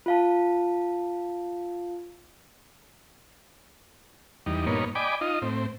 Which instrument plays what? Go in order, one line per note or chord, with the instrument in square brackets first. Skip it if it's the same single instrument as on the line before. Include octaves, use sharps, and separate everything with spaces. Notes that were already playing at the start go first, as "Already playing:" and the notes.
[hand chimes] F4 F5 A5
[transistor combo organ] E2 G3 D#4
G2 A#2 A#3 B3 D#4 C#5
D5 D#5 G5 G#5 B5 D6
D#4 F4 D#5
A2 C4